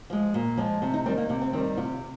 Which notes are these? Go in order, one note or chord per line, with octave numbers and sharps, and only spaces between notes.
F3 G#3
A#2
F3 G#3
C3
D#4
D#3 G3 C4
A#3
C3 A#3
C4
D#3 G3 C4
C3 F4